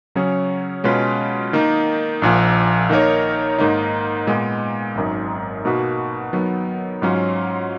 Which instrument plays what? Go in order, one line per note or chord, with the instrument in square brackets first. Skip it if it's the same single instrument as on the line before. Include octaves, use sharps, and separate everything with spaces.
[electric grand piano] C#3 F#3 C#4 G#4 C#5
B2 G#3 C#4 F4 B4
D#3 A#3 D#4
A#1 A#2 F3
D#3 A#3 D#4 A#4 C#5
G#2 D#3 A#3 D#4
A#2 G#3 B3
G#1 F#2 D#3
B2 A#3 D#4 F#4 B4
D#3 F#3 B3
G#2 F#3 C#4 F4